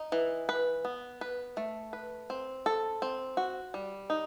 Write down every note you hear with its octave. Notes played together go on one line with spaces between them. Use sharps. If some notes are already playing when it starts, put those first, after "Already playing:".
Already playing: D#4
E3
B4
B3
B4
A3
B4
C4
A4
C4
F#4
G3
D#4